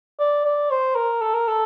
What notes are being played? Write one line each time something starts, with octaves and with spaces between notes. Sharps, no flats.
D5
D5
C5
A#4
A4
A#4
A4